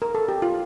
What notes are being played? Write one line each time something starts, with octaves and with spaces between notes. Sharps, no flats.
A#4
A4
G4
F4